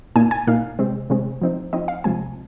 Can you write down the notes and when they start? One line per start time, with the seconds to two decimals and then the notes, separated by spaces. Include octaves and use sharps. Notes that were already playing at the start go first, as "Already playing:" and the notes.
0.16 A#2 A#3 D#4 G#5
0.31 G#5
0.47 A#2 A#3 D#4 F5
0.79 C3 G#3 C4
1.10 C3 G#3 C4
1.41 F3 C4 D#4
1.73 F3 C4 D#4 D#5
1.88 F5
2.04 C3 F3 G#3 C4 G#5